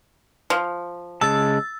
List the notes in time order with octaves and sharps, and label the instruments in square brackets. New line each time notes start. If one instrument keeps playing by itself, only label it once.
[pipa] F3
[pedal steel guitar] C#3 G#3 A5 [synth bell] E6 A6